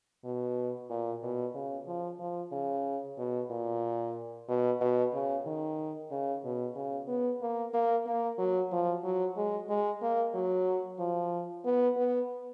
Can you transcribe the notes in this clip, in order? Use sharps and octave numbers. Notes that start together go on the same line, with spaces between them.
B2
A#2
B2
C#3
F3
F3
C#3
B2
A#2
B2
B2
C#3
D#3
C#3
B2
C#3
B3
A#3
A#3
A#3
F#3
F3
F#3
G#3
G#3
A#3
F#3
F3
B3
B3